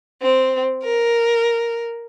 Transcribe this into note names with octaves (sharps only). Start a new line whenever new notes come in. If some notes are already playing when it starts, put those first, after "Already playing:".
C4
A#4